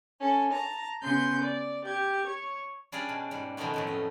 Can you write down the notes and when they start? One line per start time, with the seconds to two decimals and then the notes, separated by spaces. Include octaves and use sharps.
0.20 C#4 A4
0.53 A5 A#5
1.02 C#3 B3 C6 G6
1.41 D5
1.84 G4 G#6
2.27 C#5
2.92 G3 C#4 D4 G#4 D5 F5
3.09 B2
3.31 G#2 G3
3.57 B2 D#3 F3 A3 B3 C#4
3.74 F2 A2 F#3
3.87 C#4 D#5